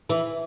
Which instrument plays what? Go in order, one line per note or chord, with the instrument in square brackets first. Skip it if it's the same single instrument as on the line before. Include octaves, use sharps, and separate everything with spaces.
[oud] E3